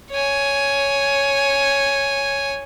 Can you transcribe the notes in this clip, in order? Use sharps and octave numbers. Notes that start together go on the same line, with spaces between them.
C#5 G#5